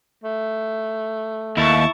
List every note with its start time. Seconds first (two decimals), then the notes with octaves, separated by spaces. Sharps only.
0.24 A3
1.57 D#2 E4 A5 C#6